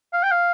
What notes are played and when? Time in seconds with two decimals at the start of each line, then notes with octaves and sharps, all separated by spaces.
0.13 F5
0.23 G5
0.31 F5